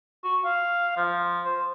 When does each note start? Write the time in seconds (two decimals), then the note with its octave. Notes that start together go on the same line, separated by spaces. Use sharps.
0.24 F#4
0.45 F5
0.97 F3
1.45 C5